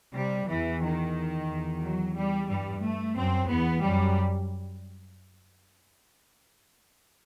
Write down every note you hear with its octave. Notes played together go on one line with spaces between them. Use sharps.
C3 G3
E2 E3
D#3
E2
F#3
G3
G2 G3
A3
F#2 C4
E2 B3
F#2 G3